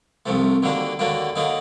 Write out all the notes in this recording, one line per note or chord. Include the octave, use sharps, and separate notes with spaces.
C2 C3 F3 A3
D#2 D3 F#3 A#3 D4
D#2 D3 F#3 A#3 D4
D3 F#3 A#3 D#4